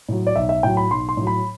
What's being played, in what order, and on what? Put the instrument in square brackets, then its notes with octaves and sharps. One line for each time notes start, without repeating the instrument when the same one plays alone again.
[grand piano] A2 F#3
D5
B1 E5
E5
A2 F#3 G5
B5
B1 C6
C6
A2 F#3
B5